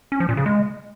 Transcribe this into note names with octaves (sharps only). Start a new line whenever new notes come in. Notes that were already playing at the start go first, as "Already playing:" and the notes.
C#4
F3
A#2
C#3
G#3